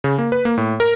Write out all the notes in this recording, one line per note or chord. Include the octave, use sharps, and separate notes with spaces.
C#3
A#3
B4
A#3
A2
A#4